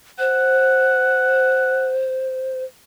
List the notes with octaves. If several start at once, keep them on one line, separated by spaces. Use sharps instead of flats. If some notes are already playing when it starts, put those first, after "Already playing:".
C5 F#5